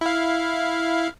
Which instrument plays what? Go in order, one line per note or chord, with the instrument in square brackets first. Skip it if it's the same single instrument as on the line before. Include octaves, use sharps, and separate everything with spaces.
[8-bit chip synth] E4 F5